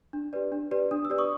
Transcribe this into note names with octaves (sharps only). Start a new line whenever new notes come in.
D4
G4 B4 D5
D4
G4 B4 D5
D4 D#6
E6
G4 B4 D5
C#6 D#6